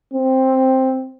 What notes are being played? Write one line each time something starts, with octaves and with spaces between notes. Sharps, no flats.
C4